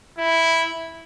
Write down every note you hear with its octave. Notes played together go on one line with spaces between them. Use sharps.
E4